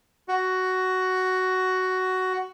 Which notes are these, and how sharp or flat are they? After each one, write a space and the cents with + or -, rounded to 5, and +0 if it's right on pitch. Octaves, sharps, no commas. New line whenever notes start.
F#4 +10